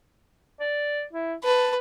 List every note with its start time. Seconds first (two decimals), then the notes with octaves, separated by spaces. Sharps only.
0.60 D5
1.13 E4
1.44 B4 A5